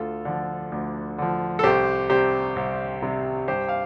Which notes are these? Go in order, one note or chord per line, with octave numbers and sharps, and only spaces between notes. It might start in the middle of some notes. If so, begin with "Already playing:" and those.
Already playing: D2 F4 A4
D3 F3
D2
D3 F3
A4
C2 G4 C5
C3 G3 G4 C5
C2
C3 G3
G2 G4 C5
F5